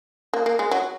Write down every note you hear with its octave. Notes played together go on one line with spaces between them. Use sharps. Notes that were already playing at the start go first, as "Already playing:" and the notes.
A#3
A#3
G#3
F#3